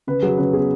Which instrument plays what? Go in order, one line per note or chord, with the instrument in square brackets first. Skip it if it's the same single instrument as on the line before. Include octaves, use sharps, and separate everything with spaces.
[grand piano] C#3 B4
F#3 G#4
C#3 B4
B3 G#4